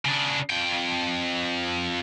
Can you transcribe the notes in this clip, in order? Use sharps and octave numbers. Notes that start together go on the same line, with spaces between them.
C#3 D4
F2 G5